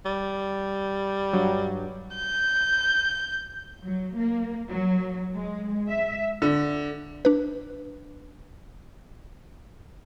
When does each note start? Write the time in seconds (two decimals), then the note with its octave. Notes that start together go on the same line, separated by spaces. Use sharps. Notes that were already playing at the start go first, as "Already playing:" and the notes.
0.06 G3
1.33 G2 F#3
2.15 G6
3.83 F#3
4.17 A#3
4.68 F#3
5.36 G#3
5.89 E5
6.42 D3
7.25 D4 B4